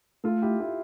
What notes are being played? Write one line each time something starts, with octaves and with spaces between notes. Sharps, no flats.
A3 F4 A4
E4 G4
E4 G4